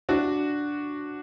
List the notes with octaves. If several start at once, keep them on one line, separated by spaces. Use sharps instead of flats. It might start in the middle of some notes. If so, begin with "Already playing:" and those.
D4 F#4